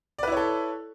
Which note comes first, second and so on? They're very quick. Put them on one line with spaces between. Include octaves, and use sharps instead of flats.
D5 B4 E4 C#5 A4